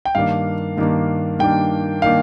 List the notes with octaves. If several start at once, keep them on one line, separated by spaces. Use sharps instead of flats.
G5
G2 D#3 A#3 D4 F5
G2 D#3 A#3 D4
G2 D#3 A#3 D4 G5
D#3 A#3 D4 F5